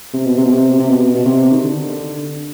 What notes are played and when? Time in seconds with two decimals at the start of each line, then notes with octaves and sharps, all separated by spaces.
0.13 C3
0.25 B2
0.37 C3
0.44 B2
0.51 C3
0.79 C3
0.89 B2
1.15 B2
1.25 C3
1.52 D#3
1.64 D3